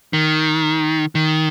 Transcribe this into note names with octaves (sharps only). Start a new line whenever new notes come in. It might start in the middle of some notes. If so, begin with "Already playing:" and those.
D#3
D#3